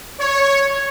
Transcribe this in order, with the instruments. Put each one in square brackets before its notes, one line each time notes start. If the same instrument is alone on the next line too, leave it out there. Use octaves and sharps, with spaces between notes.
[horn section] C#5